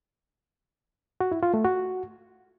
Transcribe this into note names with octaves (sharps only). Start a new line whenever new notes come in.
F#4
E4
F4
A3
F#4